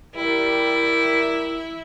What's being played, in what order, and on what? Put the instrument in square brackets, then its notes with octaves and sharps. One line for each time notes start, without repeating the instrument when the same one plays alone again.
[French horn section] G3 A#4 [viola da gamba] E4